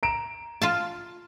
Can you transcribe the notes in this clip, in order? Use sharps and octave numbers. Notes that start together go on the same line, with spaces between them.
A#5 D7 E7
F4 F5 A5